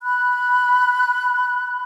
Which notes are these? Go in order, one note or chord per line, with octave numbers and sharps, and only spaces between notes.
B5 F#6